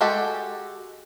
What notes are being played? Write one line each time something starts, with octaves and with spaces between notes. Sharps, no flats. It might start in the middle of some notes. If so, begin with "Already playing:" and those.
G#3 F#4 G4 A4